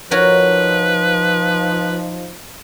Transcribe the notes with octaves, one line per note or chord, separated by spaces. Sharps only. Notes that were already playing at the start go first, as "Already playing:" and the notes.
F3 D#4 F#4 A#4 B4 C#5